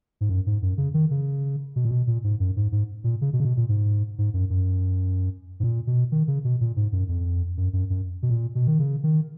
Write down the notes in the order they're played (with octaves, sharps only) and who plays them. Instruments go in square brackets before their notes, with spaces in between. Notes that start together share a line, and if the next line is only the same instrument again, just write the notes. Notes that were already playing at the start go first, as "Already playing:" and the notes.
[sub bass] G#2
F#2
G#2
F#2
C#3
D#3
C#3
B2
A#2
B2
A#2
G#2
F#2
G#2
G#2
A#2
C#3
B2
C#3
B2
A#2
G#2
G#2
F#2
F#2
G#2
A#2
B2
D#3
C#3
B2
A#2
G#2
F#2
F2
F#2
F#2
F#2
B2
A#2
B2
D#3
C#3
D#3